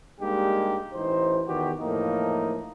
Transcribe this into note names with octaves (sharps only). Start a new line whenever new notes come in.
G3 G#3 A#3 D4 D#4 G4
A1 E3 D#4 C5
E2 D#3 B3 F#4 G4
E2 A2 F3 A3 A#3 D#4